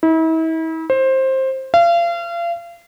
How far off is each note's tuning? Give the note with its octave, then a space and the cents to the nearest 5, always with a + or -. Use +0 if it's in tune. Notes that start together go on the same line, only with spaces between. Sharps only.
E4 -40
C5 +15
F5 -35